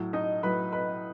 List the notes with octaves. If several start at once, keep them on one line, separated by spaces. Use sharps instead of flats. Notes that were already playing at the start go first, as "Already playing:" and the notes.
Already playing: A2 F#3
D#4 D#5
A2 F#3 B4
B4